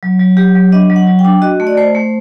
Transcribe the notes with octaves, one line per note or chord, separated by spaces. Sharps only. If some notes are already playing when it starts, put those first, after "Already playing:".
F#3
F#3
F#3 G4
F#3
D4 D#5
F#3
F#5
F#3
G5
D4
F#4 D#5
A3
D5
A3 C5
A3